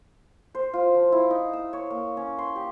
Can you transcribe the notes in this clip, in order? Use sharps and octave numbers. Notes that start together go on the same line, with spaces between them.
C5
F4
F3
E4
D#4
E6
C#5
A#3
C#4
C6
G4